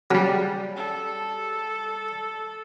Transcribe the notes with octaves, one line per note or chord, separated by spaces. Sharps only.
C#3 F#3 G3 C#4
A4